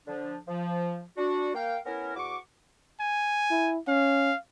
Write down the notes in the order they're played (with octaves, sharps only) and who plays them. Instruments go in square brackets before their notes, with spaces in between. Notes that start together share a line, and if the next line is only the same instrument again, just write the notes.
[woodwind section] D3 F3 D4
F3
D4 F#4
A#3 F5 G5
B3 C#4 E4 A#4
E2 F#4 C#6 D6
[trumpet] G#5
[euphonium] E4
[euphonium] C#4 [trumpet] F5